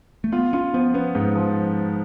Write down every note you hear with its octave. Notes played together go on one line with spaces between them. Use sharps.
A3
B3 F4
C#4 F4
F3 B3
B3 C#4
G#2
F3